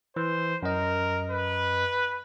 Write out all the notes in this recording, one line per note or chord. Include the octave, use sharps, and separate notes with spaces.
E3 C5
F#2 A#4 D#5
B4